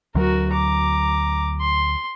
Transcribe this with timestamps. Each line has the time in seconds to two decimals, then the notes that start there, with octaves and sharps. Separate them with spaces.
0.15 D2 F#3 F#4 A#4
0.52 A#5 D6
1.61 C6